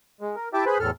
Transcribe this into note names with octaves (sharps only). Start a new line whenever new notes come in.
G#3
A#4
E4 G4 E5 G5 A5 D6
G#4 B4 C5 G#5 B5
E2 A2 A4 F6